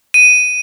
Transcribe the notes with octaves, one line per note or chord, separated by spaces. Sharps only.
D#7